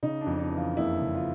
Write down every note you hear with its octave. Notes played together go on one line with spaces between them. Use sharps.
C#3 D#4
D4
F2
D#4
E3
F4
F#1 E4
C#3
F4